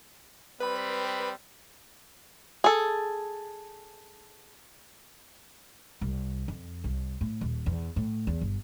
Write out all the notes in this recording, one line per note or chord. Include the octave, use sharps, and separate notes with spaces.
G3 C4 B4 B5
G#4 A4
C2
F2
C2
A2
D#1
E2
A2
E2
G1